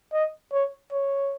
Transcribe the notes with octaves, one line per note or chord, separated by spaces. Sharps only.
D#5
C#5
C#5